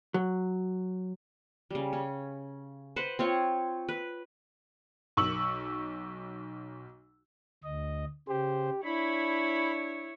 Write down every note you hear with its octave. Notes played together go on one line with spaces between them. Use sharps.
F#3
C#3 G3
C#4
B4 C5 F#5
C4 F4 C#5
B4
B1 C#6 E6 F#7
D2 D#5
C#3 G4 C5
D4 E4 C#5 B5